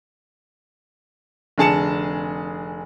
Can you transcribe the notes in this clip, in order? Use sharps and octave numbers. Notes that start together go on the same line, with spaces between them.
F1 D3 G#4 A5 C#7 E7